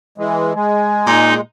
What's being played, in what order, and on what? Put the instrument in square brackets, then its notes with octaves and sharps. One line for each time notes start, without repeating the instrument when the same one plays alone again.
[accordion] E3 G#3
[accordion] G#3 [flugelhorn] G#5
[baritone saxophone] A#2 [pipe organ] D#4